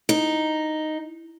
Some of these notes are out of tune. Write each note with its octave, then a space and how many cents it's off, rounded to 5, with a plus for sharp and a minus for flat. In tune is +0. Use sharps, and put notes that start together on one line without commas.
D#4 -5